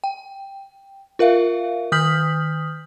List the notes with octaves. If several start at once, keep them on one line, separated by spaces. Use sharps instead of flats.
G5
F4 A#4 E5 F5
D#3 D#6 F6 G6 B6 F#7